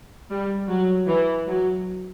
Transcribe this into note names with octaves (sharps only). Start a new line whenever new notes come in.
G3
F#3
E3
F#3